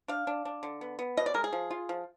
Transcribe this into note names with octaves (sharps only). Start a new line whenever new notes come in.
D4 F5
D4
D4
D3
B3
B3
B2 D#5
D5
G#3 A#4
G#4
F3
F4
F3